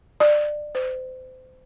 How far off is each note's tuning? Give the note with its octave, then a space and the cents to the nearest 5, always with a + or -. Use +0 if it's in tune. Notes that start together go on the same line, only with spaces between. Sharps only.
D5 +20
C5 -30